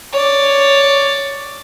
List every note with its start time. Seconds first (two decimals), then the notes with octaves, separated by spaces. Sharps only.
0.12 C#5 D5